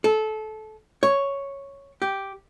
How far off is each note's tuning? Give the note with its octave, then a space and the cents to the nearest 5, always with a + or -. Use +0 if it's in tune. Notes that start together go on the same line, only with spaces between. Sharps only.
A4 -20
C#5 +0
G4 -5